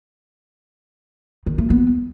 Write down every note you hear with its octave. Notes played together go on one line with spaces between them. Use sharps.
D#3
A3
B3